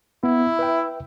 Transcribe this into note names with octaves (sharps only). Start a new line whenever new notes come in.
B3 E4
B4 E5 G5